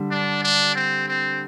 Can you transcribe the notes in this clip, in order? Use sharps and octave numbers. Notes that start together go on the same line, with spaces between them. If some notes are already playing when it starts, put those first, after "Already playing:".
Already playing: D3 G3
D4
D4
C4
C4